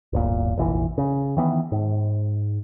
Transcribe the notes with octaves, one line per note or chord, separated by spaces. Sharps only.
D1 G1 A#2
F1 A#1 E3
C#3
D#3 E3 B3
G#2